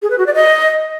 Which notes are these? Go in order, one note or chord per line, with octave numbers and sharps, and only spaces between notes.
G#4
B4
F#4
D5
D#5